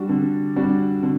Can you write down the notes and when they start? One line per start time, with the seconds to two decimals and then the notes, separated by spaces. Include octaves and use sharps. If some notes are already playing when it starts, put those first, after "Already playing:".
Already playing: G3 D4 F#4
0.09 D3
0.56 G3 D4 F#4
1.03 D3